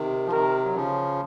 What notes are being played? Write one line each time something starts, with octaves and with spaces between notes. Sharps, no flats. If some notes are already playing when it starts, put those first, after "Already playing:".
Already playing: C3 D#3
F3
C3 D#3 A#4
F#3
C#3 F3